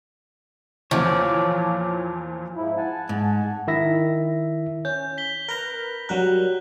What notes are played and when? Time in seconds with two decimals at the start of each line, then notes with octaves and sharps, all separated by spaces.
0.91 E2 A#2 F3 C#5 D5
2.57 G#2 F3 E4
2.77 F#5 G#5 A5
3.09 G#2
3.67 D#3 E4 E5 A#6
4.85 C#4 G6
5.18 B6 G7
5.49 A#4 B4 A#5
6.09 F#3 G3 A#4 F#6